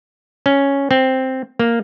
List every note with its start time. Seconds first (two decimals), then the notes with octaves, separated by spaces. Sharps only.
0.46 C#4
0.91 C4
1.59 A#3